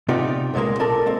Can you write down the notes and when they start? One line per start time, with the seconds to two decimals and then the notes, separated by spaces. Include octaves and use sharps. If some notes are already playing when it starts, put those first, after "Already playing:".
0.08 C3 B3 D#4 F4 G4 D5
0.54 C2 A#2 F3 G#3 A#3
0.79 B1 A4 A#4 D5 A5
1.06 G#3 A#3 C4